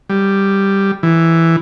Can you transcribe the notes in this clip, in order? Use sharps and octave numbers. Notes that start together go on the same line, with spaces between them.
G3
E3